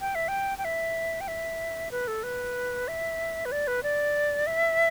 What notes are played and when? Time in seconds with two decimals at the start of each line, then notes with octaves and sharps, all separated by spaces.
0.01 G5
0.15 E5
0.28 G5
0.58 G5
0.65 E5
1.21 G5
1.28 E5
1.91 B4
2.08 A4
2.23 B4
2.88 E5
3.45 B4
3.52 D5
3.67 B4
3.83 D5
4.47 E5